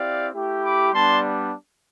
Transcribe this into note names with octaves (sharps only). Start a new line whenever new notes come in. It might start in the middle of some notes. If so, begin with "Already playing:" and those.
Already playing: C4 E4 G4 D5 F5
A3 E4 G4
B5 D6
G3 B3 D4 A5 C6